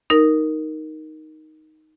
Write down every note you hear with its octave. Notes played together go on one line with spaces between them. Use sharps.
D#4 A#4